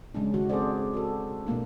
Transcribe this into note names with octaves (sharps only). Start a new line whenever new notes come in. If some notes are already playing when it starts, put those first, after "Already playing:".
C#3 G#3 C#4 D4
D#3 F#4
C4 G#4 A4 C5 D5
F#4 A4
B2 A3 A#3 D4